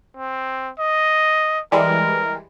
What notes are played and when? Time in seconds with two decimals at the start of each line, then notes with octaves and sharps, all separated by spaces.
0.17 C4
0.79 D#5
1.72 E3 G3 G#3 A#4